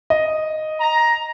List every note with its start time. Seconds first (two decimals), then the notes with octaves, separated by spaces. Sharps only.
0.10 D#5
0.80 A#5